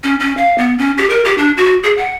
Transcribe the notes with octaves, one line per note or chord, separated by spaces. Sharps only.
C#4
C#4
F5
B3
C#4
G4
A#4
G4
D4
F#4
G#4
F#5